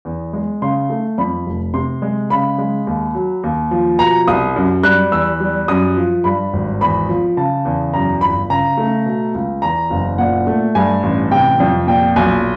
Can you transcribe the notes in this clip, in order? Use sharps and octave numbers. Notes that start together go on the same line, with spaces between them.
E2
G#3
C#3 C6
A3
F2 B5
F1
C3 C6
G#3
C#3 B5
G#3
D#2
F#3
D#2
F3
B2 A#5
C2 D#6
F#2
G3 F#6
E2 E6
G3
F#2 D#6
F3
G2 B5
G#1
E2 B5
F3
C#3 A5
E2
F#2 A#5
G1 B5
C#3 A#5
A3
B2
C#2
E2 A#5
F#1
A#2 F#5
A3
G2 G#5
A1
C3 G5
F2
A#2 G5
B1 G#5